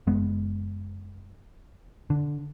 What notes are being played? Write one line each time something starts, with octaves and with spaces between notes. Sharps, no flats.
F#1 G#3 B3
D3